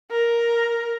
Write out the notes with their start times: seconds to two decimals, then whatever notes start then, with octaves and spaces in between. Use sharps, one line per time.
0.11 A#4